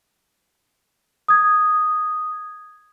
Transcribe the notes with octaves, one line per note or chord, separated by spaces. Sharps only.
D#6 G#6